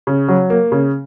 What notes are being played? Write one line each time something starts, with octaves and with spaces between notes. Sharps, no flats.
C#3
F#3
A#3
C#3